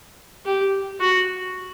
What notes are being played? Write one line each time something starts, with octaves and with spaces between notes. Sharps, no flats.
G4
F#4